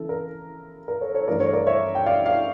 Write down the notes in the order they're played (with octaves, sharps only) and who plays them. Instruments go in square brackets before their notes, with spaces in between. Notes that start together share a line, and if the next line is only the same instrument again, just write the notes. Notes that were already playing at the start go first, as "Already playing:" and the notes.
Already playing: [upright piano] C#3 E3 A4
A#4
A#4
A4 C#5
A4 C#5
G2 E3 A3 A#4 D5
A4 C#5
A#4 D5
C#5 E5
G5
D5 F5
D5 F5